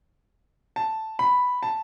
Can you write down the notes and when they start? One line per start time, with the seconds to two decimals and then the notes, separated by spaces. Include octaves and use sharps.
0.76 A5
1.19 B5
1.63 A5